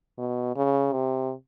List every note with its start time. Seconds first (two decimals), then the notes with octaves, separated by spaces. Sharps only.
0.18 B2
0.56 C#3
0.93 C3